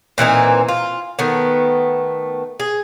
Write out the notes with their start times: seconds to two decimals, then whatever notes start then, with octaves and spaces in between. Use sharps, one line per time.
0.18 A#2 E3 C4 D#4
0.69 F4
1.19 D#3 A3 B3
2.60 G#4